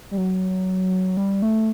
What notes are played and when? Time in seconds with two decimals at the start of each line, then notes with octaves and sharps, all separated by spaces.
0.11 G3
0.17 F#3
1.17 G3
1.42 A3